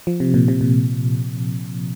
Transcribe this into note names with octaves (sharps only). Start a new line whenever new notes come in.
F3
C3
A#2
C3
A#2